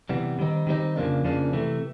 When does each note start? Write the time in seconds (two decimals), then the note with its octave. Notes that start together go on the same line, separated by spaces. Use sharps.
0.09 C3 E3 G3 B3
0.39 D#3 G3 C4 D#4
0.67 D#3 G3 C4 D#4
0.96 F2 C#3 F3 A#3 D4
1.24 F2 C#3 F3 A#3 D4
1.53 C3 E3 A3